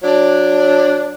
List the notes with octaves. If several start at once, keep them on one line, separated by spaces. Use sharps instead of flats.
F#3 D4